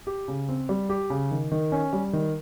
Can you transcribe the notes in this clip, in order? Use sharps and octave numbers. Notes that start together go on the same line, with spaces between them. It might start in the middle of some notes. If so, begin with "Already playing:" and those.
G4
C#3
C4
G3
G4
C#3
D#3
D#3
C#4
G3
D#3